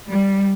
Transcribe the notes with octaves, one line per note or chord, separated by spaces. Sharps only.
G3